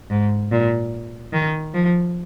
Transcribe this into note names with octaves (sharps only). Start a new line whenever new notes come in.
G#2
A#2
D#3
F3